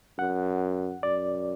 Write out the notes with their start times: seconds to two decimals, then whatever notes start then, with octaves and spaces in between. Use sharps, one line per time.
0.18 F#2 F#5
1.03 F#2 D5